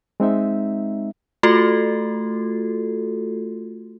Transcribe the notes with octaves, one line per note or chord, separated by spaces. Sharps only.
G#3 C4 D#4 E5
A3 F4 F#4 A4